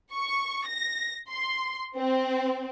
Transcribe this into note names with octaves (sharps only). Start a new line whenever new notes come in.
C#6
A#6
C6
C4